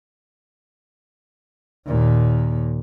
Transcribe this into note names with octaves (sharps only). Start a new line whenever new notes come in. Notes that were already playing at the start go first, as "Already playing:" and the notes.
D#2 A#2